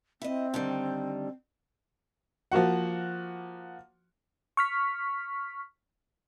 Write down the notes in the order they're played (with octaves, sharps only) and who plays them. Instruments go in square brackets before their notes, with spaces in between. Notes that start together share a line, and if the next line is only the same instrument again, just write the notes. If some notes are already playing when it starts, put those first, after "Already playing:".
[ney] C4 [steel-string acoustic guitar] E4 D#5
[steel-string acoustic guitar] D3 D#3 G3
[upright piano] F3 A#3 F#4 F#5
[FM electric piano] C#6 F6 B6